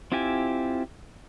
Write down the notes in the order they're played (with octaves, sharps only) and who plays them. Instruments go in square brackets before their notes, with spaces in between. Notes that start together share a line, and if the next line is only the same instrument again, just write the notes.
[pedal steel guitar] C4 E4 F4 G4 G#5